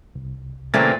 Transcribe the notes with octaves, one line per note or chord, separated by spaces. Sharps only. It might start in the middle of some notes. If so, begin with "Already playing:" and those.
C2
A#2 C#3 E3 A3 A#3 C4 A6